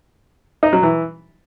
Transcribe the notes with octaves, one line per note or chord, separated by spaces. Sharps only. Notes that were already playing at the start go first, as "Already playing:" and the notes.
D#4
F#3
E3